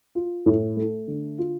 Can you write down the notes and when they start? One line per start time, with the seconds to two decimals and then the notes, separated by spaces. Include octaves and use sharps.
0.15 F4
0.46 A2
0.77 A3
1.08 D3
1.38 F4